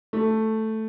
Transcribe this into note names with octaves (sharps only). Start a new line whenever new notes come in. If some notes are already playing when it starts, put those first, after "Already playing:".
A3